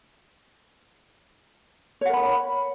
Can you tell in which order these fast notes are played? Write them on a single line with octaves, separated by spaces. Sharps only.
C#5 F#5 A#4 B5